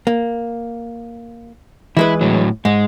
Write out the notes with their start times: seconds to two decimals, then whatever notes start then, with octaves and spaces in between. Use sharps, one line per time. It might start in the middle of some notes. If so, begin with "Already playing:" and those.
0.07 A#3
1.97 E3 G#3 E4 B4
2.21 A2 F#3
2.65 G#2 G#3